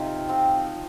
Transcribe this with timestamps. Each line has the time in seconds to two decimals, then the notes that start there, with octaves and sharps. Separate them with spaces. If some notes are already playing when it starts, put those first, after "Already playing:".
Already playing: C3 C4 D#4 F4
0.29 F3 C4